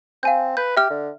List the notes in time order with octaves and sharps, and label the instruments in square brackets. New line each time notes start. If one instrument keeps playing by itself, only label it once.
[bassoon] C4 [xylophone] F5 G#5 G6
[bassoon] B4 [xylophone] G6
[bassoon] G4 [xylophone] E5 F6
[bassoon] D3